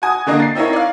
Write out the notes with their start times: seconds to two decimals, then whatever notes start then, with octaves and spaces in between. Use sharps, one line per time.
0.02 F#4 G#5 D#6
0.27 D3 A#3 D4 D#5
0.40 A6 C7
0.55 C4 D#4 E4 A#4 C#5
0.73 D5 F5